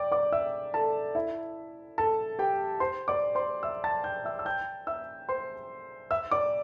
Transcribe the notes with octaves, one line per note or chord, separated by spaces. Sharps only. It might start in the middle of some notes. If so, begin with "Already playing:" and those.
Already playing: D5 G5 D6
D5 D6
E5 E6
A4 A5
E4 E5
A4 A5
G4 G5
C5 C6
D5 D6
C5 C6
E5 E6
A5 A6
G5 G6
E5 E6
E6
G5 G6
E5 E6
C5 C6
E5 E6
D5 D6